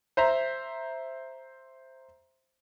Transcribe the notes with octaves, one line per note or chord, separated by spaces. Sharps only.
C5 E5 A#5